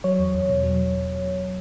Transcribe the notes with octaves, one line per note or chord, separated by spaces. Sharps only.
F#3 C#5
E2
E2
B2
F#3